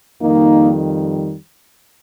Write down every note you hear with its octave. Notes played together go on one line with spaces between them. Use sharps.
F2 D#3 G3 A#3 D#4